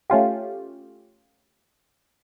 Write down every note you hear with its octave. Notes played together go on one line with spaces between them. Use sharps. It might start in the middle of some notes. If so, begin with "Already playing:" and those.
A3 C#4 F4 G4